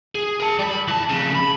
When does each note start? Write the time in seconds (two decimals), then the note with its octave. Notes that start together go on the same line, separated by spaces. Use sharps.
0.15 G#4
0.40 A#4 A5
0.59 G3 B5
0.88 E3 A5
1.09 F2 C#3
1.35 B5